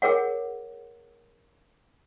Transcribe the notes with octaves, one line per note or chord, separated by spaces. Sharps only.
G#4 A#4 C#5 F#5